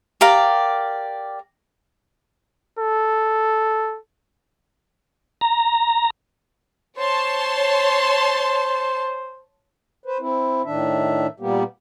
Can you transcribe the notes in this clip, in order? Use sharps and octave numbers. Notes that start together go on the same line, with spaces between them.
G4 A#4 D5 F5
A4
A#5
C5 C#5 A5 C6
B4 C5
C4 E4
A2 D#3 D4 E5
A#2 G3 A#3 B3 G4